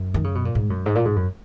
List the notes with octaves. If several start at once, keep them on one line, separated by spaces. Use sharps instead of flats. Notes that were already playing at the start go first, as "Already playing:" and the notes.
Already playing: F#2
D#3
C#3
B2
A#2
G#2
F#2
G#2
A#2
G#2
F#2